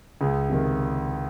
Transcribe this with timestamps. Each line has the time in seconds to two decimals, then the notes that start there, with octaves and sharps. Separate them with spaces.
0.21 C#2 G#4
0.50 C3 D#3